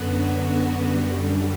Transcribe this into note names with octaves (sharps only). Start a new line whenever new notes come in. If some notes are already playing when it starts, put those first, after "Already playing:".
Already playing: F#2 D3 F#3 B3 F#4
F#2 D3 G3